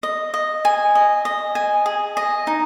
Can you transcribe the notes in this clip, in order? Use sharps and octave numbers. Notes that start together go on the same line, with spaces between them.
D#5
D#5
G#5
D#5
D#5
G#5
G#4
D#5
D#4